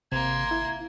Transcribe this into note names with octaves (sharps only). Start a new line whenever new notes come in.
G#1 C3 A#3 C6 G#6
E4